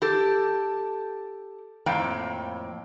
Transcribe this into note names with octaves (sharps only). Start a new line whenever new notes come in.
G4 A4
F2 A2 A#3 G5